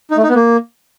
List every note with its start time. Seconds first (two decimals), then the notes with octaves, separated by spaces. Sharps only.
0.11 D#4
0.17 A3
0.23 D#4
0.29 B3
0.35 A#3